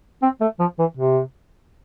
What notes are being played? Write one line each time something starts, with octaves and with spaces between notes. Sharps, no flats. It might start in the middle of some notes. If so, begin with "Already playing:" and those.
C4
A3
F3
E3
C3